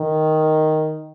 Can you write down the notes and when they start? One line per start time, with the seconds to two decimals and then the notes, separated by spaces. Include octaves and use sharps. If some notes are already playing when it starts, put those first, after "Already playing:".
Already playing: D#3